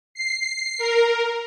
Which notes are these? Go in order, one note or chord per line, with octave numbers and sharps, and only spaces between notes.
C7
A#4